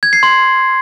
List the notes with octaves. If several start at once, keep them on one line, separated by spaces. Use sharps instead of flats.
G#6
C7
C6